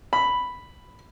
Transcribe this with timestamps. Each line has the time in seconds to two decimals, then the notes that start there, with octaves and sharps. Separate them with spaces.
0.13 B5